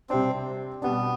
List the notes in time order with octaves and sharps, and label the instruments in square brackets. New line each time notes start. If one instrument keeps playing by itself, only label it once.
[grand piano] C3 G3 D4 [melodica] C4
[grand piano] B2 G3 D4 [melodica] B3